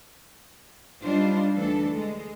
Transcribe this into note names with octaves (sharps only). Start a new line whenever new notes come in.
G3 D4 D#4 F4 C5
D2 E3 A3 D4 A4
G#3